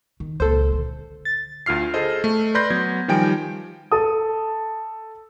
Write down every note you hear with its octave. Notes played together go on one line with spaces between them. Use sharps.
D#3
C#2 A#2 A4 C5
D3
A6
D2 F4 F6 C7
G#4 A4 C5 D#5
A3
B4 D5 B5 C6 G6 A#6
F#3 B3 G#6
D#3 F3 G3 G5 G#5 D7
A4 D#6